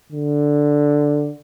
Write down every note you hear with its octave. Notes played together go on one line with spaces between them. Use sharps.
D3